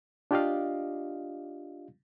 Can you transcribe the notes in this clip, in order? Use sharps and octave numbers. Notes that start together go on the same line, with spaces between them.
D4 F4 G4 D5 D#5 F5